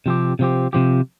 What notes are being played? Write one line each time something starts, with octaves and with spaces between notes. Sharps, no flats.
C3 F3 C4 G4
C3 F3 C4 G4
C3 F3 C4 G4